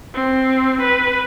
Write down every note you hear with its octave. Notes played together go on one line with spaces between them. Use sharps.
C4
B4